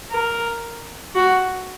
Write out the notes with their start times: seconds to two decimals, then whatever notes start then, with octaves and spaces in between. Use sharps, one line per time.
0.11 A#4
1.15 F#4